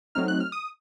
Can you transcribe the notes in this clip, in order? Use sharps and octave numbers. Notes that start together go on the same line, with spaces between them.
F#3 A3 C4 D#4 F6
F#6
F6
D#6